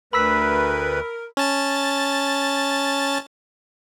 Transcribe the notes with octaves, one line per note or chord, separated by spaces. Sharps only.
D2 A#4 B4 B5 E6 B6
C#4 A5 A6